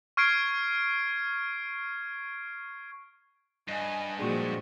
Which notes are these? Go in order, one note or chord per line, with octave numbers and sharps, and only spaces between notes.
C#6 F6 G#6 C7 D7
G2 D#5 G#5
A#2 F3 G#3 D4 F#4 G5 C#6